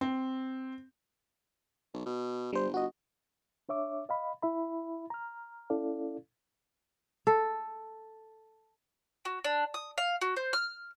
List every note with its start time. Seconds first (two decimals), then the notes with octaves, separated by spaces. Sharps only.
0.01 C4
1.94 B1
2.06 B2
2.53 G1 G3 C5
2.74 F#4 D#5
3.69 D4 C#5 E5 D6
4.09 D#5 F5 B5
4.43 E4 E5 B5
5.10 A#5 F6
5.70 C#4 E4 A4 D5 F5
7.27 A4
9.25 F#4
9.44 D4
9.74 D#6
9.98 F5
10.21 F#4
10.37 C5
10.53 F6